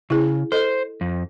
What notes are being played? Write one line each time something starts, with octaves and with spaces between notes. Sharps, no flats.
C#3 E4 G#4
A4 C5 D#5
F2